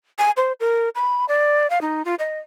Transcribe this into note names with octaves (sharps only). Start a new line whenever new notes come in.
G#5
C5
A#4
B5
D5
F5
D#4
F4
D#5